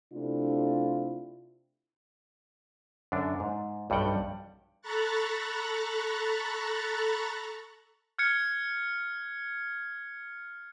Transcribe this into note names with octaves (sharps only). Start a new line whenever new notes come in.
C3 A3 D4 E4 F4
F#2 D3 D4
G#2
B1 G2 G3 F#5 G5
A4 A#5 B5 C#6 F#6 A6
F6 F#6 G#6 C#7